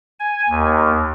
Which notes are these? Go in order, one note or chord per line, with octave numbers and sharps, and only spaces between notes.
G#5
D#2